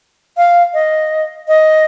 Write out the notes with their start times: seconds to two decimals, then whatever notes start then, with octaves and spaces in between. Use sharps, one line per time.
0.37 F5
0.74 D#5
1.48 D#5